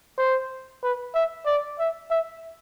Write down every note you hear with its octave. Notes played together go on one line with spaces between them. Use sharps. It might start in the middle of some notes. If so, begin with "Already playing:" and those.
C5
B4
E5
D5
E5
E5